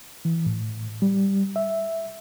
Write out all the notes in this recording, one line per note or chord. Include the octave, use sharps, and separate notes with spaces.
E3
A2
G3
E5